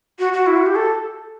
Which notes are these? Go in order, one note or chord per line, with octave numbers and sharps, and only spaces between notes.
F#4
F#4
E4
F#4
G4
A4